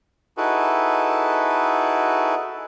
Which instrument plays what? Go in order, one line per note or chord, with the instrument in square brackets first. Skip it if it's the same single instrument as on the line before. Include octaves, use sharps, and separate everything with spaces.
[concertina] D#4 E4 F#4 G#4 A4 B4